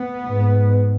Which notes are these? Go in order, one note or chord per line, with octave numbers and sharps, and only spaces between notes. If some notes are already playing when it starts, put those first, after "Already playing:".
Already playing: B3
G#2